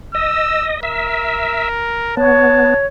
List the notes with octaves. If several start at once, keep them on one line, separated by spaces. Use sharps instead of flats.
D#5 E6
A#4 E5
B3 C#5 A5